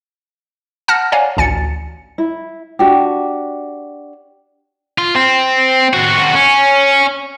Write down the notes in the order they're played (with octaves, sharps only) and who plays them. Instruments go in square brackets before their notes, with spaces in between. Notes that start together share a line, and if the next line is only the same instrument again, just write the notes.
[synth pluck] F#5 A5 F6 A#6
C#5 D5 F5 F#5 G#5 A#5
A1 D2 G#5 A6 C#7
[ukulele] E4
D4 F#4 G4
[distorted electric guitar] F4
C4
C4 F#4
C#4